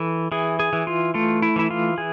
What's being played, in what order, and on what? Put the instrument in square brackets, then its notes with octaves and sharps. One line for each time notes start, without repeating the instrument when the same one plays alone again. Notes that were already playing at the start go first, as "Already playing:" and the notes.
Already playing: [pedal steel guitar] E3 A4
E3 G#4
G#4
E3
F4
A3 F4
E4
E3 E4
F4
E3 G#4